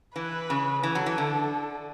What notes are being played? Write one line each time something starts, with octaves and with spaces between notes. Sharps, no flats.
E3 B4
C#3
E3 A4
F#3
E3
D3